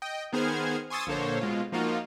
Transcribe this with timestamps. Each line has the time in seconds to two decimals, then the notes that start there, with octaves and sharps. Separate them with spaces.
0.02 D#5 G5
0.32 D#3 B3 G#4 C5 F6 G#6
0.90 G#5 C6 C#6 D#6 E6 A6
1.07 A#1 D3 A#3 A4 C5 C#5
1.41 B2 G#3 F4
1.72 F3 A#3 D#4 F4 F#4